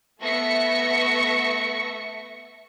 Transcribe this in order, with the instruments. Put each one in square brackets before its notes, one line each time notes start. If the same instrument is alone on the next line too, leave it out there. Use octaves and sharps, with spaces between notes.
[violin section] A3 B3 E5 C#6 A#6 C#7